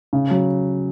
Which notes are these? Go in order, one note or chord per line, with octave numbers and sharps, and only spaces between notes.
C#3
F#3